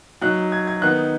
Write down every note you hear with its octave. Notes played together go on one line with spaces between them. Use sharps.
F#3 D#4 F#6
G#6
G#6
D#3 B3 D#4 F#6